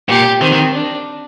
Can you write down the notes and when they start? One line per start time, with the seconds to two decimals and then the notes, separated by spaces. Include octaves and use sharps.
0.09 A#2 G4
0.41 D#3 C4
0.53 D#3
0.73 D4